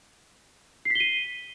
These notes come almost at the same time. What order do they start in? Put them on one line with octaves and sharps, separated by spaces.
C7 B6 G7 D#7